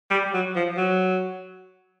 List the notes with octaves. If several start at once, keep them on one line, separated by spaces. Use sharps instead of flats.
G3
F#3
F3
F#3